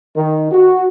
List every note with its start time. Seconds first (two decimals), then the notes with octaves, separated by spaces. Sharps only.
0.17 D#3
0.52 F#4